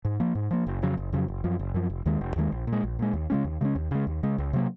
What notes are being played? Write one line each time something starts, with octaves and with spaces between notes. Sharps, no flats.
G#2
F3 A#3
G#2
F3 A#3
F#1
F2 C#3 F#3
F#1
F2 C#3 F#3
F#1
F#2 F3
F#1
F#2 F3
F1
D#2 D#3 G#3
F1
D#2 D#3 G#3
A#1
A#2
G#3
A#1
A#2 G#3
D#2
C#3 G#3 C#4
D#2
C#3 G#3 C#4
D#2
C#3 G#3
D#2
C#3 G#3
C#2
C3 F#3 A#3